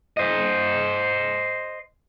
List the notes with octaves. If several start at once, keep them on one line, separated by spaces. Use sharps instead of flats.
C5 D#5